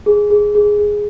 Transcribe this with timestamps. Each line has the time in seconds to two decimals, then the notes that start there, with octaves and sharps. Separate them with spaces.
0.06 G#4
0.30 G#4
0.55 G#4
0.78 G#4